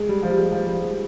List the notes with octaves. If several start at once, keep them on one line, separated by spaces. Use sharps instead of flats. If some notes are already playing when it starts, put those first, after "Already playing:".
Already playing: G#3
G3
F3
G3
G#3
F3
G3
G#3